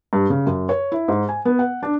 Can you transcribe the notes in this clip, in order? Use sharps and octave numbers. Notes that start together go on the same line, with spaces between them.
G2
C#3
F#2
C#5
E4
G#2
G#5
B3
F#5
D4